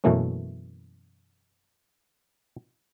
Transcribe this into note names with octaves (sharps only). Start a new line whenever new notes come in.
F#2 B2 E3 A3 A#3 C#4